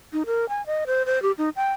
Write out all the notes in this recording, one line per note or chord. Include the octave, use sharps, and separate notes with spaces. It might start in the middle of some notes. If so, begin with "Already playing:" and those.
D#4
A#4
G#5
D#5
C5
C5
G4
D#4
G5